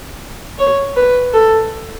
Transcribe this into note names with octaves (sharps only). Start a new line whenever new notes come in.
C#5
B4
A4